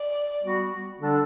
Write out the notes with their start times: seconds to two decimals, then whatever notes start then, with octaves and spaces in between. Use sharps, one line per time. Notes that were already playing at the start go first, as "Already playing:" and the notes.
Already playing: D5
0.42 G3 B3 F#4
0.98 D3 G3 D4 A4